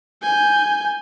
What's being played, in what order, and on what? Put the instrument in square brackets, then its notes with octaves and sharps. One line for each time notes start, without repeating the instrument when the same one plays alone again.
[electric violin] G#5 G6